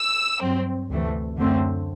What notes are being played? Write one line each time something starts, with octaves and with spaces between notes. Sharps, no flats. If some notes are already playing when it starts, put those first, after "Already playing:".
Already playing: E6
G2 F#3 C4
D2 C3 E3 A3
F#2 D3 A3 C4